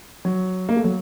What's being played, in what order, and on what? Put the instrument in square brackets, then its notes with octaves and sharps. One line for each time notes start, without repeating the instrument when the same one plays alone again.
[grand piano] F#3
A#3
A3
F#3